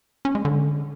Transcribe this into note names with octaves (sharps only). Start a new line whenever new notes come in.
C#4
G#3
D3